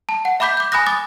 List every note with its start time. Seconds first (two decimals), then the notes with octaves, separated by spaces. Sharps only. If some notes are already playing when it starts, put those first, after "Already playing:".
0.09 A5
0.25 F#5
0.40 E5 B5 D6 G6 B6
0.57 D6 G6
0.72 G#5 B5 D#6 F#6 A#6
0.87 D6 D#6 A6